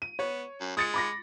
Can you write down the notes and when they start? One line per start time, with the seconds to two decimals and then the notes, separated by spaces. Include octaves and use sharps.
0.02 D#7
0.19 B3 C#5
0.61 F#2
0.77 G#3 D#6 A6 C#7
0.94 B5 D6 A#6